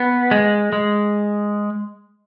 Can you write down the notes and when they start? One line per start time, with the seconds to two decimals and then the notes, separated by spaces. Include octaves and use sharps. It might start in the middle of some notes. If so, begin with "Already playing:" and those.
Already playing: B3
0.31 G#3
0.72 G#3